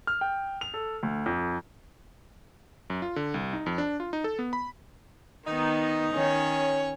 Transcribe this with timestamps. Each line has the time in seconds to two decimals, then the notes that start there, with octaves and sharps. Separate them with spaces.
0.07 F6
0.21 G5
0.61 F7
0.74 A4
1.03 D2
1.26 F2
2.90 F#2
3.02 F4
3.16 D3
3.34 C2
3.53 D#4
3.66 F2
3.78 D4
4.00 F4
4.13 D#4
4.24 A4
4.39 B3
4.53 B5
5.47 D#3 B3 D#4
6.13 D#3 C#4 C#5